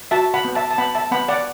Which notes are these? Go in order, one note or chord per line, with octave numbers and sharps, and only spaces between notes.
F#4 E5 A5
F#5 B5
B3
E5 A5
A5
B3 F#5 B5
E5 A5
B3 F#5 B5
D5 F#5